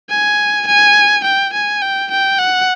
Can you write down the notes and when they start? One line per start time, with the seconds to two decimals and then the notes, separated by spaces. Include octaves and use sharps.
0.10 G#5
0.67 G#5
1.24 G5
1.53 G#5
1.82 G5
2.11 G5
2.39 F#5